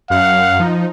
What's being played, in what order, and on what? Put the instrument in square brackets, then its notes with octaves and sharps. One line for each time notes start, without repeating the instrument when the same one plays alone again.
[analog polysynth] F#2 F#5 [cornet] F5
[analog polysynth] F3 D#4